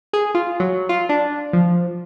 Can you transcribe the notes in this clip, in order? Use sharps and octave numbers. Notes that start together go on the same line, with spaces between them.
G#4
F4
F#3
F4
D4
F3